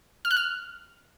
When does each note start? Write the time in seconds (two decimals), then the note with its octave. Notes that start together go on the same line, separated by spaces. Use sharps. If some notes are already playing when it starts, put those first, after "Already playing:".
0.25 F6
0.31 F#6
0.37 F6